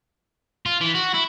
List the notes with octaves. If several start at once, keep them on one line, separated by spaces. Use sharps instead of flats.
F4
E3
F#4
E4